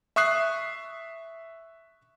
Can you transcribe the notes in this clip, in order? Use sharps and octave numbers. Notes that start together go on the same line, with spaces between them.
E5 C#6 D#6 F#6 C7